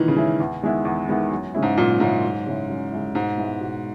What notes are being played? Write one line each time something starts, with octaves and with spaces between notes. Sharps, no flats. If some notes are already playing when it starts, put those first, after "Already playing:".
Already playing: A#2 D#3 E3 G#3 C#4 E4
C#3
G#3 C#4 E4
E2
D#3 G#3 B3 E4
E2
D#3 G#3 B3 E4
F#2
C#3 G#3 C#4 E4
G#2
F#2 A#2
G#2 C#3 G#3 C#4 E4
F#2
C#3 G#3 C#4 E4
F#2
C#3 G#3 C#4 E4
G#2 B2
G#3 B3 E4
B2